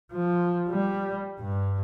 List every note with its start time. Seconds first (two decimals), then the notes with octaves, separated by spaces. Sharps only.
0.12 F3
0.69 G3
1.40 G2